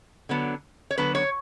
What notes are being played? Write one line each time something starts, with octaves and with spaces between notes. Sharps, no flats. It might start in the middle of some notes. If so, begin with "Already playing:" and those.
D3 F#3 B3 D4
C#5
D3 F#3 B3 D4 B4
C#5